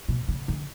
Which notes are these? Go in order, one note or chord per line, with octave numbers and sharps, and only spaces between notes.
B2
C#3
D3